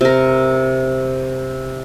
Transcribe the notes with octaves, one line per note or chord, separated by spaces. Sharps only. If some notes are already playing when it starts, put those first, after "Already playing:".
C3 A#4